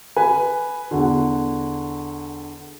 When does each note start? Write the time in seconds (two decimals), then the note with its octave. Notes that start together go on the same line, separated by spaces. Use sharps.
0.16 B4 G#5
0.91 E2 D3